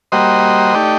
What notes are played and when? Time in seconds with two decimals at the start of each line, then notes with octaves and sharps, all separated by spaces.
0.12 G3 A#3 F#4 C5 D#5
0.74 A3 D#4 G4 D5